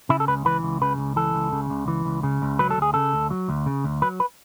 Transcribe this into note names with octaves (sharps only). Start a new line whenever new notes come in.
C#3 E4
A4
C#2 B4
E3 B4
C#2
C#3 B4
C#2
E3 A4
C#2
C#3
C#2
E3
C#2
C#3
C#2
F#3 B4
A4
D2 G#4
C#3 A4
D2
F#3
D2
C#3
D2
F#3 B4
B4